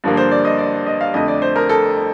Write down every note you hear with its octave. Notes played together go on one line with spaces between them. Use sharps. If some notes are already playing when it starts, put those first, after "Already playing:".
G2 D3 F3 A#3
C5
D5
D#5
D5
D#5
F5
F2 D3 A3 D#5
D5
C5
A#4
A4